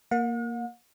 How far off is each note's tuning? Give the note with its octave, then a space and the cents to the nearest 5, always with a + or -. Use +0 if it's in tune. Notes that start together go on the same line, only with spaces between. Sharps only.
A#3 +0 F#5 -45